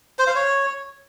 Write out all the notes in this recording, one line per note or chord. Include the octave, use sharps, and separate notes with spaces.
C5
F5
C#5